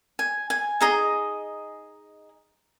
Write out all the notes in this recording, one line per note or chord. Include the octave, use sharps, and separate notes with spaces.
G#5
G#5
D#4 G#4 D#5 A#5